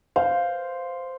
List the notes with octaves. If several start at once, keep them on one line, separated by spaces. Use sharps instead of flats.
C5 F5